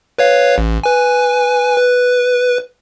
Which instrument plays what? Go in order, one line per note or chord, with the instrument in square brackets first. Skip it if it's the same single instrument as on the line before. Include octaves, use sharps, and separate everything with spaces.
[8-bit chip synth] B4 C#5 F5
A1
B4 G#5
B4